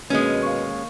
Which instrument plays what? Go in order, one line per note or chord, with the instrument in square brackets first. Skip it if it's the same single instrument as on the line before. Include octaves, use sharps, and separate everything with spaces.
[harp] D#2 G#4 [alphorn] B2 [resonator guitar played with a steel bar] G#3 C#4
[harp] F5 C#6